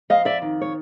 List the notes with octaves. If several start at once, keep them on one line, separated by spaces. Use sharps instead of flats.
F2 D#5 F5
D5 E5
D#3
C#5